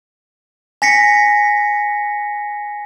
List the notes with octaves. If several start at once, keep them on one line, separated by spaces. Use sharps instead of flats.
G#5 A#6 B6 C#7